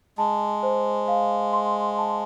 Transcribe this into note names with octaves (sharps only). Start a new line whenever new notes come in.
G#3 A5
C5
F5
C6
A5